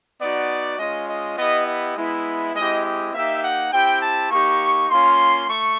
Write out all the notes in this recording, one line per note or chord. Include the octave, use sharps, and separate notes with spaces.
B3 D#4 F#4 D5
G#3 C#4 F4 D#5
D#5
B3 E4 G4 D#5
D#5
G#3 B3 E4
G#3 C4 E4 G4 D#5
D#5
A#3 D#4 G4 E5
F#5
C4 E4 G4 G5
A5
A#3 D#4 G4 C#6
A#3 C#4 F4 C6
A3 C#6